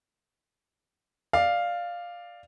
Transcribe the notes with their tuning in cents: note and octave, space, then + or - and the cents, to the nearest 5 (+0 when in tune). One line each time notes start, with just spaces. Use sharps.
D5 +10 F5 +0